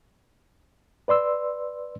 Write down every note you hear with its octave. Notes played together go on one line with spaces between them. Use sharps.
B4 D5 C6 E6